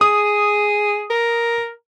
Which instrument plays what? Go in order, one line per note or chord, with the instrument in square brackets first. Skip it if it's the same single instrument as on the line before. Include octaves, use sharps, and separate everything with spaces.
[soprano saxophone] G#4 [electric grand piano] D#6
[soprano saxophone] A#4